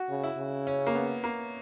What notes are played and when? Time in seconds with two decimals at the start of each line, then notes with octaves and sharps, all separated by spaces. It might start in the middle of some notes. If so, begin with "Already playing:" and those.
Already playing: F#4
0.09 C#3
0.23 E4
0.38 C#3
0.67 C#4
0.87 A#3
0.95 B3
1.24 A#3